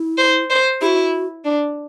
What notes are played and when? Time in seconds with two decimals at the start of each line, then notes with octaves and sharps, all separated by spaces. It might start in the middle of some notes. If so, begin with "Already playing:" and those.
Already playing: E4
0.18 C5
0.50 C5
0.81 E4 F#4 G4
1.45 D4